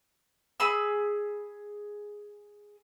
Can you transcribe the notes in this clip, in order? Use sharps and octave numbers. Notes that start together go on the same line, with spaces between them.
G#4 B5 E6